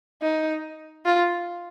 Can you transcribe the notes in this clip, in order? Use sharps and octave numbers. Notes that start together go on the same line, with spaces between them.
D#4
F4